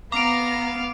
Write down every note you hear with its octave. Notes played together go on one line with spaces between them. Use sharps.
B3 F5 A#5 D6 F6 D7